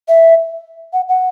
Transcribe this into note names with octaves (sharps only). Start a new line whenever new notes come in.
E5
F#5
F#5